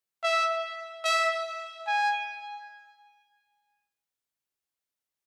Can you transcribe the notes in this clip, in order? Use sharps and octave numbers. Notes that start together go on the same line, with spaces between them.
E5
E5
G#5